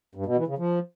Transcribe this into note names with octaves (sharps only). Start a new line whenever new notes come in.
G2
B2
E3
C#3
F3